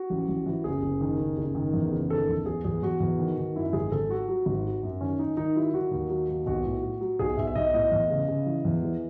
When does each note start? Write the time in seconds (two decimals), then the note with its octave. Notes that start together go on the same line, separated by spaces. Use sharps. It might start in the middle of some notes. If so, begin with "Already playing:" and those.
Already playing: F#4
0.10 A1
0.28 A1
0.46 E3
0.64 F#1 G#4
0.82 F#1
1.01 D#3
1.19 F#1
1.37 F#1
1.55 D#3
1.73 E2
1.92 F#1
2.10 D#3 A4
2.29 E2
2.46 E2 G#4
2.64 E2 G#4
2.83 E2 F#4
3.00 E2
3.19 D#3
3.38 D#3
3.55 F#2 E4
3.73 G#1 G#4
3.92 G#1 A4
4.09 F#3 F#4
4.29 F#3
4.46 G#1
4.65 F#3
4.83 F#2
5.01 D#3 C#4
5.19 D#3 D#4
5.37 D#3 D#4
5.56 F#3 E4
5.73 D#3 F#4
5.91 D#2
6.10 F#3
6.29 D#2
6.46 B1 F#4
6.65 A2
6.82 F#3
7.01 F#3
7.19 B1 G#4
7.37 B1 E5
7.47 E5
7.55 B1 D#5
7.74 A2 D#5
7.92 E2
8.10 C#3
8.28 C#3
8.46 E3
8.65 E2
8.83 E3